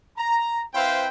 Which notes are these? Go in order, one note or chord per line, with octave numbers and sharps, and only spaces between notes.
A#5
C4 E4 B4 C5 F5 G5